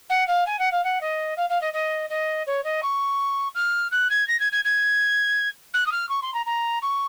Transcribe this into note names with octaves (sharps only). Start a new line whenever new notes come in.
F#5
F5
G#5
F#5
F5
F#5
D#5
F5
F5
D#5
D#5
D#5
C#5
D#5
C#6
F6
F#6
G#6
A#6
G#6
G#6
G#6
F#6
D#6
F6
C#6
C6
A#5
A#5
C#6